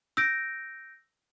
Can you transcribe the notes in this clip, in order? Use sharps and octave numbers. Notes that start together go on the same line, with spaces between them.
E6 G6 A#6 D7